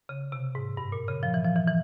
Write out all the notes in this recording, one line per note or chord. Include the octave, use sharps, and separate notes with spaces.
C#3
C3
G#2
G2
A#2
C#3
F3
E3
F3
E3
E3